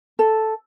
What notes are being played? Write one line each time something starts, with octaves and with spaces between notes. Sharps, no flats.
A4